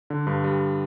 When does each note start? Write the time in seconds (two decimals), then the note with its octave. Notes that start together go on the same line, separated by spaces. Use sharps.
0.10 D3
0.27 G2
0.44 G3